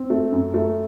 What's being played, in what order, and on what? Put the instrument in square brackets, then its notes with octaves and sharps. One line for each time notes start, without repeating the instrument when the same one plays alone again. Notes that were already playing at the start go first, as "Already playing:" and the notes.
Already playing: [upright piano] C4
A3
F#2
A3